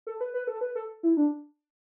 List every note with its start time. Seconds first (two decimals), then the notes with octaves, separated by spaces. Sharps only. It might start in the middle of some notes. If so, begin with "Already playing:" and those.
0.07 A4
0.21 B4
0.34 B4
0.47 A4
0.61 B4
0.75 A4
1.03 E4
1.17 D4